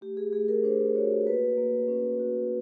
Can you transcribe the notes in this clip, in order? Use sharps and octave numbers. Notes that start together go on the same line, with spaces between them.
A3 G4
G#4
A3 G#4
A#4
D4 C5
F#4 C#5
A#3 B4
A#3
C#4
F#4